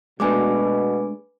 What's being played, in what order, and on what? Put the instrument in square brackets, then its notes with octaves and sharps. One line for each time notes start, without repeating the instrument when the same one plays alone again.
[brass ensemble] B2 [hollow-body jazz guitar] G#3 A3 D4 [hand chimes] B4 G#5 D6